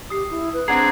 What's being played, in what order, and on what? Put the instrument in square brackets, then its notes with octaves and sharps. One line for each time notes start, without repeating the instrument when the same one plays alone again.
[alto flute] G4 [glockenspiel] D#6 C7
[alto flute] E4
B4
[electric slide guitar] C4 D4 G#4 [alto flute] F#5 [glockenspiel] A#5 G#6